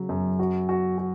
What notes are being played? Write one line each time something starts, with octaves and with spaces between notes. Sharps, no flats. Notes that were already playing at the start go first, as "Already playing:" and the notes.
Already playing: C#3 F#3
F#2
F#4
F#4
F#4